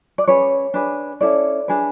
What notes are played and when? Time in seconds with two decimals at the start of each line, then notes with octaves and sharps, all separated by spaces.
0.18 D5
0.27 C#4 G#4 B4 C#5
0.74 D4 G#4 B4
1.21 C#4 E4 A4 D5
1.68 D4 G#4 B4